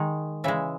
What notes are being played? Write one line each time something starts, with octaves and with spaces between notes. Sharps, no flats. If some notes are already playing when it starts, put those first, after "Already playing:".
Already playing: D#3 G#3
C#3 E3 G#3 E5